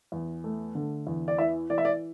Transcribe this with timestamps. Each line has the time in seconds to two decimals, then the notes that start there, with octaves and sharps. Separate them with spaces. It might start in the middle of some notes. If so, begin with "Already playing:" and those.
0.12 E2
0.44 A3
0.75 D3
1.07 E2
1.28 D5
1.38 E3 E5
1.70 E3 D5
1.78 E5
1.85 D5